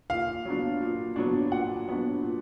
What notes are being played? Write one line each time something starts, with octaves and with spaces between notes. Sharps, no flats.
A#2 F5
F#3 B3 D4
A#2
F#3 B3 D4
A#2 F#5
F#3 B3 D4
A#2